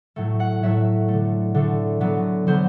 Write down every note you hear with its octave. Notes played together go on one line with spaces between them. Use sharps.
A2 F#3 A3
F#5
A2 F#3 A3 E5
D3 A3
D3 A3
D3 F#3 B3
D3 F#3 B3 C5